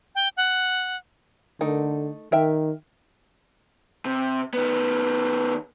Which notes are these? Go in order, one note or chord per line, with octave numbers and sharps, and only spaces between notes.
G5
F#5
D3 A3 D#4 A#4
D#3 A#4 E5 G5
C3
D#3 B3